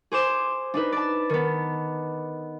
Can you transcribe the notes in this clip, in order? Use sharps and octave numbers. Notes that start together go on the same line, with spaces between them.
G#4 C5 D6 E7
D4 D#4 B4
D5 A5
D#3 B3